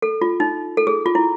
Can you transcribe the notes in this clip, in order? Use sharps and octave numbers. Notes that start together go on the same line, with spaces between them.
A4
F4
D#4
A4
G#4
F4
E4